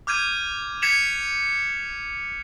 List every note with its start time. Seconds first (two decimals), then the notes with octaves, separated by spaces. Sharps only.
0.07 D6 F6 G6 G#6 D#7
0.82 G#6 B6 C#7 E7 F7